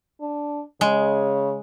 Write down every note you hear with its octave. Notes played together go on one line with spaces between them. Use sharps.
D4
C#3 G#3